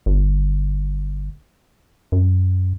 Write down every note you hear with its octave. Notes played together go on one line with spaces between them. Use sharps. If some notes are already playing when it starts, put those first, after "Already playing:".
G1
F#2